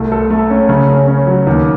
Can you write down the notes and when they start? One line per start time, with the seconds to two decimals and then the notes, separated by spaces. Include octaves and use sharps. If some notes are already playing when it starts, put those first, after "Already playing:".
Already playing: C2 A3
0.12 A4
0.30 A3
0.50 C#4
0.69 C#3
0.88 C#4
1.08 C#4
1.27 F#3
1.47 D#2